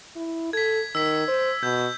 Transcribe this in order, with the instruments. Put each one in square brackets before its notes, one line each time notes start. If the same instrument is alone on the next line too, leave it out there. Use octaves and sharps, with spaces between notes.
[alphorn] E4
[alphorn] A4 [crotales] G#6 B6
[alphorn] D#3 [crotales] E6 B6
[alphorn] C5
[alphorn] B2 [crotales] G6